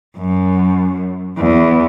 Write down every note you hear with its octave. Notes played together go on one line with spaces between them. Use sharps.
F#2
E2